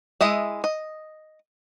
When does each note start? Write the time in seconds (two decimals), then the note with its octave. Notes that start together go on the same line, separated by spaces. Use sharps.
0.21 G#3 E4 D#5 E5
0.64 D#5